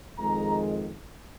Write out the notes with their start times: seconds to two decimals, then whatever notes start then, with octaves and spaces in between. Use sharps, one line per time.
0.18 F2 D#3 G#3 A#5